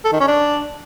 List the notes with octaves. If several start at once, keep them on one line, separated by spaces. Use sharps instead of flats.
A4
D#3
C#4
D4